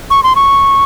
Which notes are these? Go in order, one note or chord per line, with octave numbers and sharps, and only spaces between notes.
C#6
C6
C#6